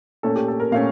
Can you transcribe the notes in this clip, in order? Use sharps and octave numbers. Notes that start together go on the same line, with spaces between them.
A#2 A3 C#4 A4
G4
A4
A#4
A#2 A3 C#4 F5